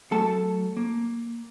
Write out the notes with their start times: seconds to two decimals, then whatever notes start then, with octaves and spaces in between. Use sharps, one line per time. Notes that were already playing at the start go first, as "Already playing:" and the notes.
0.11 F#3 A3 A4 A5
0.77 A#3